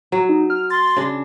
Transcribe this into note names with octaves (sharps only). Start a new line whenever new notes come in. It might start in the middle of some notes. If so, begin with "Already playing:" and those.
F#3 F#4
D#4
F6
C6 A6
C#3 D4